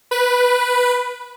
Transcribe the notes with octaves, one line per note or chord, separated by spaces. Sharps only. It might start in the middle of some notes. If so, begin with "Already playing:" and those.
B4